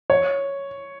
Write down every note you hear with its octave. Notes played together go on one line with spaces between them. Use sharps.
C#5